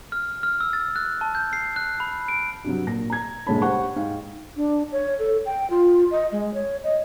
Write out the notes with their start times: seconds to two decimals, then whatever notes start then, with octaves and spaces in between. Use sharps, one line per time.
0.12 F6
0.43 F6
0.60 E6
0.73 A6
0.96 F#6
1.21 A5
1.35 G6
1.53 C7
1.76 F#6
2.00 B5
2.28 D7
2.64 G2 C3 F#3
2.87 A#2 A#6
3.10 A#5 G#6
3.47 G1 A#2 G#3 C#5 A5 B5
3.62 G4 C5 F#5 C#6
3.96 G#2 F5 G5
4.57 D4
4.92 C#5
5.19 A4
5.46 G5
5.70 F4
6.11 D#5
6.32 G#3
6.54 C#5
6.84 D#5